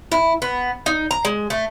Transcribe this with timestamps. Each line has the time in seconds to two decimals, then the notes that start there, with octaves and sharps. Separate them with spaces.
0.12 E4
0.42 B3
0.86 D#4
1.11 A#5
1.25 G#3
1.50 A3